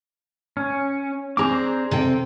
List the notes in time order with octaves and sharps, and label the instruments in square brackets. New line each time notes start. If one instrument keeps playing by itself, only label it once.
[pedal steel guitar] C#4
[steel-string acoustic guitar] C4 D4 G#4 [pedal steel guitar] C5 A#5 D6
[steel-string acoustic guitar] C3 A4 G5